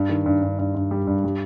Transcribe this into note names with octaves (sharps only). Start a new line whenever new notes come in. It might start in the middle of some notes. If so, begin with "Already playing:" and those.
Already playing: G2
D#3
G2
G2
G2
G2
G3
G2
G3